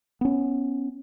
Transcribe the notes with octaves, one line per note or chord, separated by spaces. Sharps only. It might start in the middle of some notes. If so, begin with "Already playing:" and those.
B3 C#4